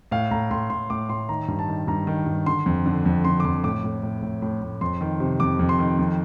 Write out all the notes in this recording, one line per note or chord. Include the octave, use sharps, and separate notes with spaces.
A2 F5
A2 A#5
A2 C6
A2 C6
A2 D6
A2 C6
D#3 A#5
G2
A5
D#3
G2 A#5
D#3
G2
D3 C6
F2
D3
F2
D3 C6
D6
F2 C6
A2 D6
A2
A2
A2
A2
A2
F2 C6
D#3
C3
F2 D6
F2
C6
D#3
F2